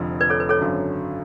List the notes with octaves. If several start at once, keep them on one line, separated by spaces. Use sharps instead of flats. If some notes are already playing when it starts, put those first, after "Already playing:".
Already playing: F1 F2 D3 F3
B4 D5
A4 C#5
B4
A4 C#5
G#1 F#2 D3 F#3